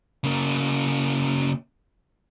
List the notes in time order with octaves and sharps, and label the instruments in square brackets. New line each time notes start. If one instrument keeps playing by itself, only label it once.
[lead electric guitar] C#3 A#3